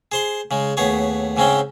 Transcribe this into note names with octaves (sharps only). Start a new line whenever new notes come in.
G#4 C5 C6
C#3 G#3
D#2 A2 B3 G#4 C#5
G#2 C#3 G#3 C4 C#4 G5